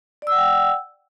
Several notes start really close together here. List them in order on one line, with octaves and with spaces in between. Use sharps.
D5 E6 F#5 G5